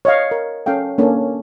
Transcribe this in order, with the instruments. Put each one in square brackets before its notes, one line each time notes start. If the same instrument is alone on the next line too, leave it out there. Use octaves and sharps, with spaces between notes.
[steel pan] C#5 D#5 F5
A#4
C#4 A4 F5 G5
A#3 C#4 D4 A4